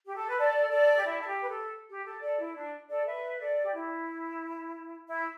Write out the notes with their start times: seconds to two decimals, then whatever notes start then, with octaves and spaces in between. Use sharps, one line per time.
0.06 G4
0.16 A4
0.28 B4
0.38 A4 D5
0.71 A4 D5
0.97 G4
1.05 E4
1.21 A4
1.27 G4
1.41 B4
1.49 A4
1.89 G4
2.05 A4
2.22 A4 D5
2.39 E4
2.56 D4
2.89 A4 D5
3.05 B4 E5
3.39 A4 D5
3.62 G4
3.74 E4
5.07 E4